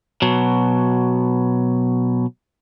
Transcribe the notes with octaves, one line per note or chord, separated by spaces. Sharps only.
B2 F#3